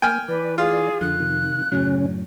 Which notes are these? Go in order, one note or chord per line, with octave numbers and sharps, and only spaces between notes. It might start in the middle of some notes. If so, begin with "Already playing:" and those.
A#3 G5 G#5 F6
E3 B4 D5
F4 G#4
F2 D3 F3 F#6
C3 D#3
F#2 A2 C#3 F#3 C#4